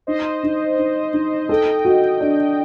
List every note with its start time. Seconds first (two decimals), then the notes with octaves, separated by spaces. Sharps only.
0.07 D#4 C5 D#5
0.43 D#4
0.79 D#4
1.13 D#4
1.49 A4 D#5 G5
1.85 F#4
2.20 D4